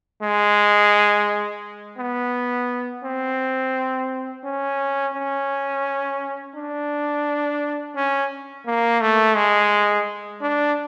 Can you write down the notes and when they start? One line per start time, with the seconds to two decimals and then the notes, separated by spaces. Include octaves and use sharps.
0.22 G#3
1.98 B3
3.04 C4
4.44 C#4
5.14 C#4
6.56 D4
7.96 C#4
8.66 A#3
9.01 A3
9.36 G#3
10.41 D4